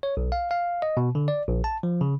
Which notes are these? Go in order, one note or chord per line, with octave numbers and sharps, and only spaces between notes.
C#5
B1
F5
F5
D#5
B2
D3
D5
A#1
A5
F3
C#3